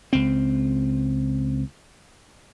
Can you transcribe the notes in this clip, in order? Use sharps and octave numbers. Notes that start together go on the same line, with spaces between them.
C#2 C4